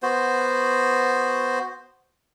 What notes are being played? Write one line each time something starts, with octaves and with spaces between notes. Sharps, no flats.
B3 F#4 C5